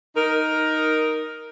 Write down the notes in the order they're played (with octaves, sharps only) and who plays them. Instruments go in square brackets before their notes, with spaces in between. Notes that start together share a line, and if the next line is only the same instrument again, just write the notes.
[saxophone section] D#4 A#4